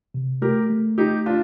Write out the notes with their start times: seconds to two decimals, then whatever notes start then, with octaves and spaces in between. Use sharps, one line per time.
0.14 C3
0.42 A3 G4 A#4
0.70 A3
0.98 A3 D#4 G4
1.26 D4 F4